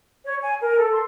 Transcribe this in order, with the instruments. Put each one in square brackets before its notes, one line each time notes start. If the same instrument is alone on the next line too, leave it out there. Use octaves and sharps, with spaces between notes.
[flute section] C#5
G#5
A#4
A4
C6